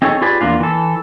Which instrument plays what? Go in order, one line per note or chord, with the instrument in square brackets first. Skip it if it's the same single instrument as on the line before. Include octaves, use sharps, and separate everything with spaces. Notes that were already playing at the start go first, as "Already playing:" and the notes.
[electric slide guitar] C4 D#4 G#4 A4 B4 C#5
F4 G4 G#4 B4 C#5 D5
E2 A#3 D4 F4
E3 A4